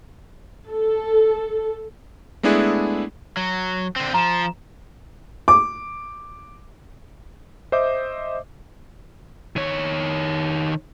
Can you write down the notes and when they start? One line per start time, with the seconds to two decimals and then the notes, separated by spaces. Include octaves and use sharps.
0.69 A4
2.43 G#3 A3 B3 D4 E4 G#4
3.37 F#3
3.96 D3 C4
4.14 F3 A#5 E7
5.48 D6
7.72 C5 D#5 E5 D6 G6
9.56 D#3 C#5